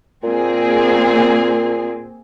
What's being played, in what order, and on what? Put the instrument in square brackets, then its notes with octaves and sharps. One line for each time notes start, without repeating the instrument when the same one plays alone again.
[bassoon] A#2 [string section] A#3 C4 G#4